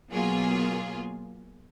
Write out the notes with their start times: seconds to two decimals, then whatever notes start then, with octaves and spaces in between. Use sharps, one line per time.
0.11 B2 F#3 A#3 F4 G#4